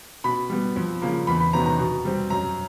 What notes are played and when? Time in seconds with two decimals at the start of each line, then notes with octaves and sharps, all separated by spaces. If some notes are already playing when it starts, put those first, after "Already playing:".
0.24 B2 B5
0.50 G3 B3
0.76 F2
1.02 C#3 F3 A#3
1.27 E2 B5
1.40 B5
1.53 C3 D#3 F#3 B3 A#5
1.66 A#5
1.79 B2
2.05 G3 C4
2.30 F#2 A#5